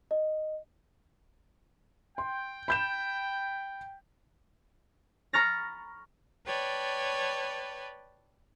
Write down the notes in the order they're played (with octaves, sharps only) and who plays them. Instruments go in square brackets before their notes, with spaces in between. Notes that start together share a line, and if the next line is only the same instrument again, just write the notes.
[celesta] D#5
[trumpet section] G5 [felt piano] C6
[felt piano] B5 G6 E7
[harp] A#5 B5 C#6 F6 A6 A#6
[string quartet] B4 C#5 D5 G5 A5